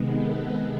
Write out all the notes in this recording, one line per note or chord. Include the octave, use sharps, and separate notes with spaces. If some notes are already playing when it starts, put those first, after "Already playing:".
Already playing: C3 D#3 G#3 B3
A4 B4